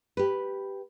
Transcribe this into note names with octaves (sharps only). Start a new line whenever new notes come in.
G4 B4